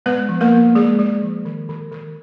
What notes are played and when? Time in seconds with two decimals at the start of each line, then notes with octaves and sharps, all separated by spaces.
0.06 G#3 B3 B4
0.29 F3
0.41 A#3 A#4
0.52 F3
0.75 G#3 G#4
0.99 G#3
1.22 F3
1.45 D#3
1.69 D#3
1.92 D#3